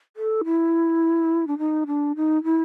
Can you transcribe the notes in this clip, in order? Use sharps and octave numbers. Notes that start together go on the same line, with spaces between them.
A4
E4
D4
D#4
D4
D#4
E4